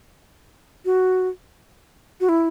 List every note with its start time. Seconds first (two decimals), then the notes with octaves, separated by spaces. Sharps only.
0.85 F#4
2.20 F#4
2.29 E4